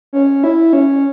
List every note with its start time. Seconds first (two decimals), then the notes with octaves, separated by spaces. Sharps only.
0.13 C#4
0.44 E4
0.73 C#4